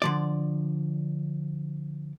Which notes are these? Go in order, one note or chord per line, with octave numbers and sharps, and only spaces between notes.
D3 F3 D5